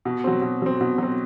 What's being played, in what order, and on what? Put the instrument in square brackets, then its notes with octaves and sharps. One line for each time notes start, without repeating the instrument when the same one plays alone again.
[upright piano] B2
F#3 C4
B2
F#3 C4
B2
F#3 C4